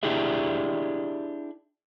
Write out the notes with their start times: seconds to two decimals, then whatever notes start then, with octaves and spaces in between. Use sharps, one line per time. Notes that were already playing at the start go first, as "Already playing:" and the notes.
0.03 D4 E4 G4 G#4 E5